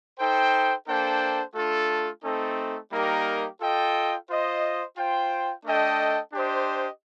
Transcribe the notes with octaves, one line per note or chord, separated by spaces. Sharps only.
D#4 A4 C5 G5
A#3 D4 A4 C5 G5
A3 D4 F4 A4
A3 C4 D#4 A4
G3 A#3 D#4 G4 A#4
F4 A4 D#5 G5
F4 C5 D#5
F4 C5 G5
A3 D4 A4 D#5 G5
D4 G4 C5 D#5